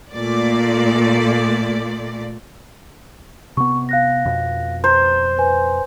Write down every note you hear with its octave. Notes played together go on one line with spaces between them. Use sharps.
A#2 A3 D5
C3 B3 C#6
F5 F#6 A#6
F2 B2
C5 A#5
B4 G#5 C6